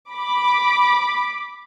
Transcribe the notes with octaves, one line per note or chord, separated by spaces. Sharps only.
B5 D6